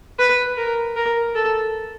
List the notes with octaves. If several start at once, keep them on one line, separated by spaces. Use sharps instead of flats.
B4
A#4
A#4
A4